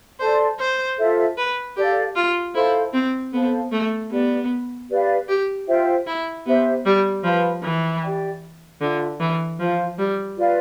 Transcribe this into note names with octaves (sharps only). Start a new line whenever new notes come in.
A4 C5 D5 A5 C6
C5
F4 A4 C5 E5
B4
G4 A4 D5 F5
F4
E4 A4 C5 F5 C6
C4
B3 A4 C5 F5 A5
A3
B3 G4 B4 D5
G4 B4 D5 F5
G4
F4 C5 E5 G5
E4
B3 G4 C5 E5
G3
F3 B4 F5 B5
E3
G4 D5 G5
D3 F4 A4 E5
E3
F3 F4 C5 F5
G3
F4 B4 D5 F5